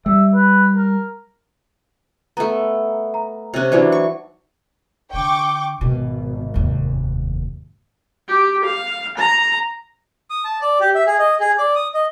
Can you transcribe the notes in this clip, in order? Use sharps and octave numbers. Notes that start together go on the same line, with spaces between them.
G3 E5
B4
A#4
A3 B3 A#5
A#5
C3 C#4 C5 F#6
E3 F#3 D4 D#4 C5 D5
C#6
D3 G5 C#6 D6
G#1 B2
F1 D#2
G4
F5
A#5
D#6
A5
D5
G4
E5
G#4
D#5
G#4
D5
D#6
D#5